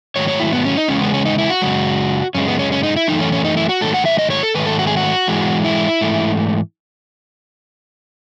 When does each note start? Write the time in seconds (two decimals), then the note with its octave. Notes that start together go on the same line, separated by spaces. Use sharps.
0.16 G#2 D#3 F#3 A3 C#5
0.28 C#5
0.39 E4
0.53 B3
0.65 C#4
0.77 D#4
0.88 E2 C#3 G#3 C#4
1.01 B3
1.14 C#4
1.25 D#4
1.38 E4
1.50 F#4
1.62 F#2 C#3 G#3
2.35 F#2 C#3 G#3 C#4
2.48 B3
2.59 C#4
2.72 C#4
2.83 D#4
2.96 E4
3.08 F#2 E3 A3 D#4
3.20 C#4
3.32 C#4
3.44 D#4
3.57 E4
3.69 F#4
3.81 G#2 D#3 F#3 A3 A4
3.94 F#5
4.05 E5
4.19 D#5
4.30 C#5
4.43 A4
4.54 G#2 D#3 F#3 A3 B4
4.66 A4
4.79 F#4
4.87 G#4
4.97 F#4
5.28 G#2 E3 G#3
5.65 E4
6.01 G#2 E3 A3